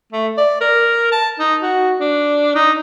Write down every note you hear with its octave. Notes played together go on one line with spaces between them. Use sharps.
A3
D5
A#4
A5
D#4
F#4
D4
D#4